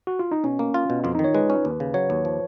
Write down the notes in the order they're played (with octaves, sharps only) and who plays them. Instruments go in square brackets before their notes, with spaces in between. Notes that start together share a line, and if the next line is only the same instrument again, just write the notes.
[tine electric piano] F#4
F4
D#4
[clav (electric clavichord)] B2 [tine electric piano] C#4
[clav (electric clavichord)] A#3
F4
B2
[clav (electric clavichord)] F2 [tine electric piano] F4
[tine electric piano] D#4
[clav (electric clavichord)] D#3
[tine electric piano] C#5
[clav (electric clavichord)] G#3 [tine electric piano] B4
[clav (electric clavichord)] C#4
D#2
C#3
[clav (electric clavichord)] F#3 [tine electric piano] C#5
[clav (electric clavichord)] D#2
F3